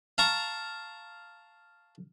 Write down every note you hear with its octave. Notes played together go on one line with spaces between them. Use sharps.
F5 A5 A#5 C#6